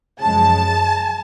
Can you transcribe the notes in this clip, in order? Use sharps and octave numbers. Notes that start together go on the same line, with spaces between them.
F#2 C#3 F3 G#3 A5